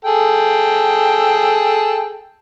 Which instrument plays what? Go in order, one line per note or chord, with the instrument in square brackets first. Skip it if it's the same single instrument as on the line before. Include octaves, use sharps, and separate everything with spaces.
[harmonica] G#4 A4 G5